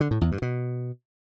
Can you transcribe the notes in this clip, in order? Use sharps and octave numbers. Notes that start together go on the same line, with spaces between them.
D3
A2
E2
G2
B2